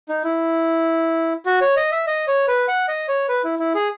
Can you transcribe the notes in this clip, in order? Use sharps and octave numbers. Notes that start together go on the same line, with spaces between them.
D#4
E4
F#4
C#5
D#5
E5
D#5
C#5
B4
F#5
D#5
C#5
B4
E4
E4
G#4